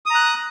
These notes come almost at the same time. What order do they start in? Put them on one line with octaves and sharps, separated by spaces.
D#6 A#5 F#6